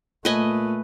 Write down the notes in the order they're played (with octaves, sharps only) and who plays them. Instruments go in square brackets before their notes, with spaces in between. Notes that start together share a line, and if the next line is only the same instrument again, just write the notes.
[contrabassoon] A#2 [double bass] A3 [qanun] B4 D#5 G#5